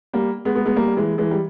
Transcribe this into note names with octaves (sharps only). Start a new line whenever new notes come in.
G3 A#3
G#3 B3
G#3 B3
G#3 B3
G3 A#3
G3
E3 G#3
E3 G#3
G3